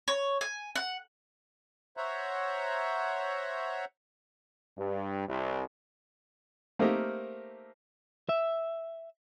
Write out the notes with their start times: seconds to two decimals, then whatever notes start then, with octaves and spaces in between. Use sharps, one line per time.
0.08 C#5
0.41 G#5
0.76 F#5
1.97 C5 C#5 E5 F#5 A#5
4.77 G2
5.28 C2
6.79 A3 A#3 C4 D#4 G4 A#4
8.29 E5